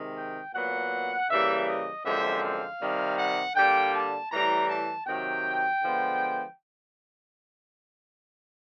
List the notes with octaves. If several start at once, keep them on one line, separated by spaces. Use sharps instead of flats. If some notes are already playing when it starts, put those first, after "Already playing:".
Already playing: C3 D#3 G#3
G5
A#2 F#3 B3 F#5
C#3 E3 G3 A#3 E5
D#5
F#2 D3 F3 G#3 C4 E5
F5
C3 D#3 G3
F#5
D3 G3 A#3 G5
A5
A2 E3 G3 A#5
A5
C3 D#3 F#3 G5
D3 F3 G#3 B3